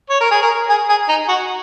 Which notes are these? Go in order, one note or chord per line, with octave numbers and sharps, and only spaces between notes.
C#5
A#4
G#4
A#4
G#4
G#4
D#4
F#4